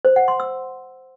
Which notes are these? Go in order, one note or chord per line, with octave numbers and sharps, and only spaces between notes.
C5
F#5
C6
E6